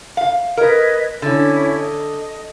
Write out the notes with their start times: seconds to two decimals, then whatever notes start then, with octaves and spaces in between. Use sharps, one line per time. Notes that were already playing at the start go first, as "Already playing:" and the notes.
0.17 F5
0.57 A#4 B4 D#5 G#6
1.22 D3 C#4 E4
1.76 D#5